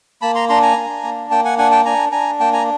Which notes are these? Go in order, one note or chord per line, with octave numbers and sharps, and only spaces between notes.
A#3 A5 B5
A#5 C6
D4 A#5 C6
G#5 A#5
D4
A#3
A#3 G5 A5
F#5 G#5
D4 F#5 G#5
G5 A5
D4 G#5 A#5
D4 G#5 A#5
A#3 G5 A5
G#5 A#5